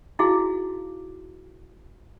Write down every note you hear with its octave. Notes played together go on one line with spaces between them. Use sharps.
D#4 E4 F#4 G#4 F5